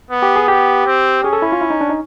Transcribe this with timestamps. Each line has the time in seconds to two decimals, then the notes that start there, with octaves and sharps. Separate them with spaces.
0.11 B3
0.22 G4
0.36 G#4
0.48 B3 G4
0.86 C4
1.23 C#4 G#4
1.33 A4
1.42 E4
1.52 F4
1.61 E4
1.70 D#4
1.81 D4
1.89 D#4